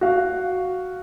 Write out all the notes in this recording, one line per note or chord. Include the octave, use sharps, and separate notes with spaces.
F#4 F5